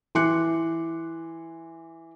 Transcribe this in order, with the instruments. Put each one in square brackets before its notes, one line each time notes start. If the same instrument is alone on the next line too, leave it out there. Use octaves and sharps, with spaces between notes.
[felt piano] E3 C6 D6 F#6 C#7